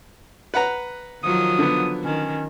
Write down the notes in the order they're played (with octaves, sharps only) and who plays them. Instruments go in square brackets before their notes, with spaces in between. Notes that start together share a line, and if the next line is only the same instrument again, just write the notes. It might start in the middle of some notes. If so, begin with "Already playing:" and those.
[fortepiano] B4 F#5 A#5
[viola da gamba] D#3 F3 F#3 [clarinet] D#6
[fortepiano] D3 B3
[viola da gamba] D#3 [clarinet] C#4